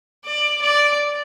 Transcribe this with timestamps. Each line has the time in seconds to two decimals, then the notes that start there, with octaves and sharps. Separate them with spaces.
0.25 D5
0.61 D5